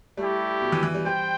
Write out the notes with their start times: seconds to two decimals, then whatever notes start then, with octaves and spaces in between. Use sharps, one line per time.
0.17 G3 A3 E4 G4
0.61 B2
0.72 E3
0.83 E3
0.95 G3
1.05 G3 C5 G5